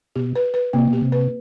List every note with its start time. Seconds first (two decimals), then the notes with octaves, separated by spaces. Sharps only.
0.16 B2 G4
0.36 B4
0.54 B4
0.73 C3 A#3
0.88 B2
0.93 G4
1.01 C3
1.12 B4